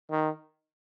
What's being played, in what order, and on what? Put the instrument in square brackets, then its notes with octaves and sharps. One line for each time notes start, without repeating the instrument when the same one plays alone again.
[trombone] D#3